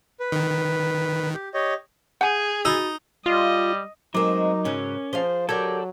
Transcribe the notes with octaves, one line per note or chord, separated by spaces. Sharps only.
B4
D#3
G4
G4 C#5 D#5
G#4 F#5 G#5 G6 D#7
D#4 F#4 B5 E6 A6
G3 F4 D#5
F#3 G#3 C4 D#4 A#4 D6
G#2 C#3 F#3 C#4
F3 G#4 C5 F5 G7
F#3 G4 A4 A#4 D5 G#6